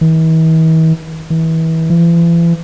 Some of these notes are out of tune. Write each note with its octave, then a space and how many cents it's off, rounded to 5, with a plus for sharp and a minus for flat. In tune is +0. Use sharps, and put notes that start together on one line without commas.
E3 -45
E3 -30
E3 +40